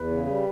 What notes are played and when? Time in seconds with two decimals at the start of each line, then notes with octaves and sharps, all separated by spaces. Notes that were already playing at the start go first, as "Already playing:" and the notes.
Already playing: E2 B4
0.11 C#3
0.26 G3